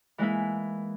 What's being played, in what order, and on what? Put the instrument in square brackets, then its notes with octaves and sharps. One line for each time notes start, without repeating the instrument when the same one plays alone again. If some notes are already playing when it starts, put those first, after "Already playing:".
[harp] E3 G#3 A#3 E4